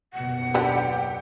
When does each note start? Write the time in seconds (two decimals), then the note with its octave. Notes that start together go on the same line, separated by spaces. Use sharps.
0.14 F#1 D#2 B2 F#5
0.54 D3 G4 B4